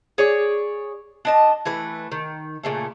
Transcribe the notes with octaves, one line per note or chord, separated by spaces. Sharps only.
G#4 C#5 D5
D4 D#5 A5
E3 A3 B4
D#3
A#2 C#3 A3